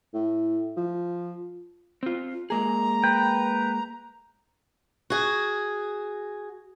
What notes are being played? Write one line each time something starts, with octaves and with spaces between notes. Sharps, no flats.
A2
F3
C4 F4
G#3 A#3 G#4 A#5
B4 G5
F#4 G#4